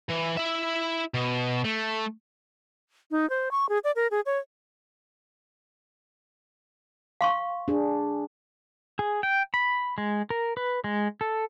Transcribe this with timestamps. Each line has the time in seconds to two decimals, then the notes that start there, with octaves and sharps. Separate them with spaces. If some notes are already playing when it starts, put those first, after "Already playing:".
0.09 E3
0.37 E4 E5
1.14 B2
1.64 A3
3.11 D#4
3.30 C5
3.51 C#6
3.69 G#4
3.84 D5
3.96 A#4
4.11 G#4
4.26 C#5
7.21 F5 C6 C#6
7.68 D4 G#4
8.99 G#4
9.23 G5
9.54 B5
9.98 G#3
10.30 A#4
10.57 B4
10.84 G#3
11.21 A4